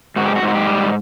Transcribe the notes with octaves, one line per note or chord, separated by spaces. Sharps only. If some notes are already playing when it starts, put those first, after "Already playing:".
G#2 F#4
G4
F#4
G#2
F#4
G4
G3